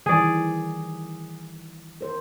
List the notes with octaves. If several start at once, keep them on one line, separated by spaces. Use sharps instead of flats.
D#3 E3 G3 G#4 D5
A#4 C5